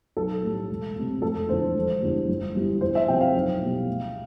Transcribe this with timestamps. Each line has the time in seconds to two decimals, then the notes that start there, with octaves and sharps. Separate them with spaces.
0.17 B1 A4
0.43 A2 G3
0.70 E1
0.96 D2 C3
1.22 F1 A4
1.49 E2 D3 F3 C5
1.75 E1
2.02 E2 D3 G3
2.29 G1
2.55 G2 E3 G3
2.81 E2 C5
2.95 E5
3.08 C3 F3 G5
3.21 F5
3.34 B1
3.61 B2 G3
3.87 D2